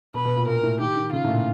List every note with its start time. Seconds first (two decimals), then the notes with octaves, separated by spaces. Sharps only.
0.14 B2 B4
0.25 B2
0.36 A#2
0.48 A#2 A#4
0.63 A2
0.79 D#3 G4
0.96 D#3
1.12 C#3 F4
1.24 A2
1.29 A#2